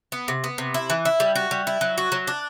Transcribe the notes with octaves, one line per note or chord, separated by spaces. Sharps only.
B3
C3
B3
C3
E4
E3
E4
G3
F#4
G3
E4
F#3
F#4
F#3
D4